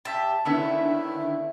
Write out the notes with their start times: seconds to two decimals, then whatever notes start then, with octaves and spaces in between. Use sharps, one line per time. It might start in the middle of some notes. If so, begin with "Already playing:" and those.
0.05 G4 E5 A5
0.45 D3 D#3 A3 B3 C#4 E4 E5